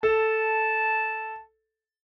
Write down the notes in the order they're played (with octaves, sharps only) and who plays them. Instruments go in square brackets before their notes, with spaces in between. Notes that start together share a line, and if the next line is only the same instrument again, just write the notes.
[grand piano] A4 [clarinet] A5